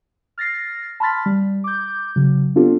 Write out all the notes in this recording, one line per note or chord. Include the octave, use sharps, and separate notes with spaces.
F6 A6 A#6 C7
A5 B5 C6 F6 A6 B6
G3
D6 G6
C#3 F#3
B3 C4 D4 F4 G4 A4